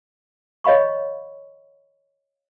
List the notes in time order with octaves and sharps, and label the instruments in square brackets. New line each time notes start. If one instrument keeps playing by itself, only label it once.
[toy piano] C#5 D#5 F5 B5 C#6